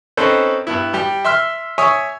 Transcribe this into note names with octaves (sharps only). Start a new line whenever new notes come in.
C4 C#4 D#4 A4 B4 C5
G2 B3 E4
G3 G4
E5 C6 E6 F6
C#5 E5 G#5 C#6 D#6